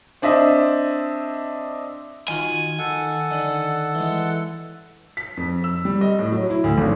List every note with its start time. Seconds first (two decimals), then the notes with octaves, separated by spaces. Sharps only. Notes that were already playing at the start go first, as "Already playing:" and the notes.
0.22 C4 D4 D#5 E5
2.28 D#3 F4 F#4 G#5
2.79 D#3 A4 F#5
3.31 D3 D#3
3.95 E3 G#3
5.17 B6
5.37 F2
5.64 E6
5.85 G3
6.01 D#5
6.19 A2
6.32 F#3
6.50 E4
6.64 D2
6.77 G#1